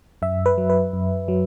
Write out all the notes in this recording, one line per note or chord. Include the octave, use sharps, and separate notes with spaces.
F#2 E5
B4
F#3
B4
F#2
F#3